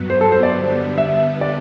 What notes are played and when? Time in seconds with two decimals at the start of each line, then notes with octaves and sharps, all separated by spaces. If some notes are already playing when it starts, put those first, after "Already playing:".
Already playing: G2 F#3 B3
0.10 C5
0.21 A4
0.32 C5
0.43 D5
0.54 D3 G3 B3 D4
0.98 E5
1.41 D5